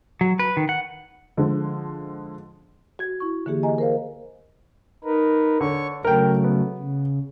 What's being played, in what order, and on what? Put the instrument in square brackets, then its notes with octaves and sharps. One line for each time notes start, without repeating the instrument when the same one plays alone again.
[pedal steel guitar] F#3
B4
D#3
F#5
[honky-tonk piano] D3 F3 G#3
[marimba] F#4 G#6
E4 C#6
D3 E3 A#3 G4 G#4
D#5 G#5 A#5
A#4 C5 F5
[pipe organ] D#4 A#4 B4
[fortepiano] D3 [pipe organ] C#5 C#6
[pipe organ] C#3 F#3 A3 [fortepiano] A#4 G5
[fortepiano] B3
[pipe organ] C#3